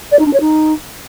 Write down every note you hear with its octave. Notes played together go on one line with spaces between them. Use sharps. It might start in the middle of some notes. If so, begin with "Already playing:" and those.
D5
D#4
D4
C#5
D#4